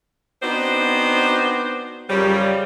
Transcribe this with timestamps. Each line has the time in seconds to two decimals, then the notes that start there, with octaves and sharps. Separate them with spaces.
0.43 B3 C4 D4 D#4 F#4 C5
2.10 F#2 C#3 F3 G3